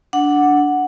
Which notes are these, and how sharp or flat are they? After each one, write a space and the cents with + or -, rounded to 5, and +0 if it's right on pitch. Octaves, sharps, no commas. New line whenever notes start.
D4 -5 F#5 +0